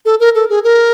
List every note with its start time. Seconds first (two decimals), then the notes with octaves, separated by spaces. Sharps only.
0.05 A4
0.20 A#4
0.35 A4
0.49 G#4
0.64 A#4